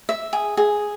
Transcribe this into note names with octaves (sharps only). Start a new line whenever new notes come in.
E5
G#4
G#4